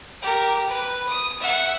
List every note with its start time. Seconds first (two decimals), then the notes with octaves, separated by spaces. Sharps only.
0.22 G4 A#4
0.67 B4
1.08 D#6
1.40 E5 F#5